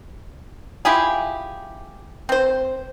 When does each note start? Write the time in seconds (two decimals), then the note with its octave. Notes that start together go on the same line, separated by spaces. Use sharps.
0.85 E4 F4 G4 G#4
2.29 C4 C5